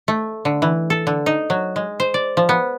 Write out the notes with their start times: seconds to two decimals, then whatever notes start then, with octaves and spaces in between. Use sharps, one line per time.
0.08 A3
0.45 D3
0.62 E3
0.90 A4
1.07 D3
1.26 D#4
1.50 F#3
1.76 G#3
2.00 C5
2.14 D5
2.37 F3
2.49 B3